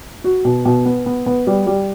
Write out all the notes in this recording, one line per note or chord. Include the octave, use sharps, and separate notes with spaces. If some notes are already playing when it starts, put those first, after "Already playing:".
F#4
B2
B2
B3
B3
B3
G3
G3